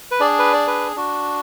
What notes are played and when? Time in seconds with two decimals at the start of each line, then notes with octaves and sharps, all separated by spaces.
0.11 B4
0.20 D4 G#4 D5
0.39 B4
0.53 D5
0.67 B4
0.96 D4 F#4